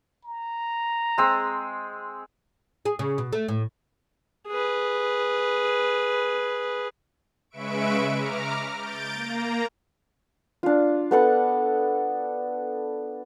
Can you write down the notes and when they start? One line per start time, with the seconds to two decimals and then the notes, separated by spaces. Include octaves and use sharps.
0.24 A#5
1.18 G#3 C4 E6
2.85 G#4
2.99 C#3
3.18 B2
3.33 A3
3.48 A2
4.48 G#4 B4
7.50 C#3 G#3 B4 E5 C#6 D7
8.17 A#5 D6 F6
8.77 G6 A6 D7
9.13 A#3 A#5
10.63 D4 F4
11.11 B3 A4 F#5